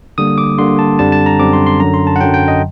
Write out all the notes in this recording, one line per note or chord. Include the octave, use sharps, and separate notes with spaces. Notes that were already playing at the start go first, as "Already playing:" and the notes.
D3 G3 A#3 D#6
D6
D3 G3 A#3 C6
A5
F#2 D3 G3 C4 A5
A5
A#5
F#2 D3 G3 C4 D6
C6
C6
F#2 D3 F#3 A#5
C6
A5
F#5
F#2 D3 F#3 G5
G5
D#5